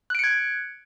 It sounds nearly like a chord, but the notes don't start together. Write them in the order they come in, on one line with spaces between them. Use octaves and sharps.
F#6 D7 C#7 G#6